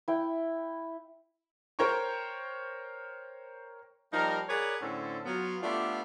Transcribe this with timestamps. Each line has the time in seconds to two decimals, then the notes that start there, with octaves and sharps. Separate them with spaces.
0.08 E4 G5
1.79 A#4 C5 C#5 G5 A#5 C#6
4.12 F3 G3 A#3 D#4 A#4
4.49 G#4 A#4 B4 C#5 D5 F#5
4.82 A2 D3 C4 C#4 A4
5.25 F#3 B3 F4
5.62 A3 B3 D4 F4 G4 A4